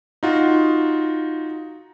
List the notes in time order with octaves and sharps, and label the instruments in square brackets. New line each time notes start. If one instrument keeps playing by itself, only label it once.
[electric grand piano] D#4 F4 F#4